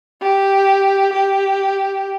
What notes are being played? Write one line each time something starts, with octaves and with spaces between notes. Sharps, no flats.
G4
G4